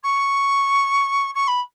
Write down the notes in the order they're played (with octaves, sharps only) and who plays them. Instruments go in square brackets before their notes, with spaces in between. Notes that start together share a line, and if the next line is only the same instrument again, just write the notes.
[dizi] C#6
C#6
B5